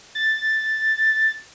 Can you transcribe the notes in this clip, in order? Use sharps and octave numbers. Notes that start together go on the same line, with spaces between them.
A6